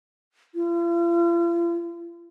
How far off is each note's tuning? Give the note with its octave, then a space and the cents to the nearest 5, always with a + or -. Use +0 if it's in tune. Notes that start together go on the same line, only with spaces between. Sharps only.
F4 -45